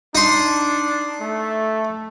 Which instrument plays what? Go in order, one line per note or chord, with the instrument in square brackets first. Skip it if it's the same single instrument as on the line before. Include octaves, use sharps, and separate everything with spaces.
[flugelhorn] D4 [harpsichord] D#4 C6
[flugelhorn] A3